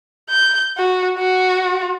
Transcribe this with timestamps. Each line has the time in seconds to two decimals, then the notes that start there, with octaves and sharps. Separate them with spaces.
0.30 G6
0.77 F#4
1.18 F#4